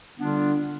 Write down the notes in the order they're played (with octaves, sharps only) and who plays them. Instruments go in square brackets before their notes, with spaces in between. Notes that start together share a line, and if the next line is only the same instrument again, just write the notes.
[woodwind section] D3 G3 B3 D4 F4